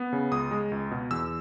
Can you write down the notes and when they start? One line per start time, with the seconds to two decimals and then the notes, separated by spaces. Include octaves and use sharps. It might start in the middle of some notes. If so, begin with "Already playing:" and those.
Already playing: B3
0.13 C#3
0.32 C#2 D#6
0.51 G#3
0.72 C#2
0.91 B2
1.11 E2 E6